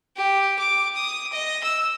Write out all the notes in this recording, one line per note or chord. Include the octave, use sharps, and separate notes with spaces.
G4
D6
D#6
D#5
E6